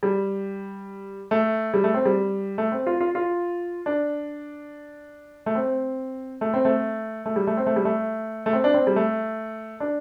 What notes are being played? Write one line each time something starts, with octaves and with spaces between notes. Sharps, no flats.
G3
A3
G3
A3
C4
G3
A3
C4
F4
F4
F4
D4
A3
C4
A3
C4
A3
A3
G3
A3
C4
A3
G3
A3
A3
C4
D4
C4
G3
A3
D4